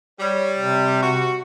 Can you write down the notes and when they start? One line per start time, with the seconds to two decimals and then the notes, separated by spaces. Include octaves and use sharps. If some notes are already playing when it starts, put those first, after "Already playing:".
0.20 G3 C#5
0.58 C3
1.03 F#4